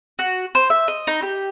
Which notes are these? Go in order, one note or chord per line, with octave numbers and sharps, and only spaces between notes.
F#4
C5
E5
D#5
D#4
G4